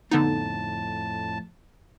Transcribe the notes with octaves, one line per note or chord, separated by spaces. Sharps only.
F2 A2 D3 B3 D#4 A5